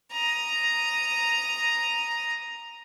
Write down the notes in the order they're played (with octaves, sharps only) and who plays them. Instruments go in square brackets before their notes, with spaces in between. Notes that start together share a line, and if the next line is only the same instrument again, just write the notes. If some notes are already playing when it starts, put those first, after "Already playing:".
[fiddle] A#5 D#6